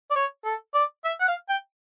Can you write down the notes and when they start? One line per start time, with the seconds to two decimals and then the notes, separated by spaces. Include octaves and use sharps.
0.11 D5
0.16 C#5
0.45 A4
0.74 D5
1.05 E5
1.21 F#5
1.28 F5
1.50 G5